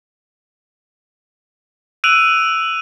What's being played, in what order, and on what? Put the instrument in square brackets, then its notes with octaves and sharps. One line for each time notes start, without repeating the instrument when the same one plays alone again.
[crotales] E6 F#6 D7 D#7 F7 F#7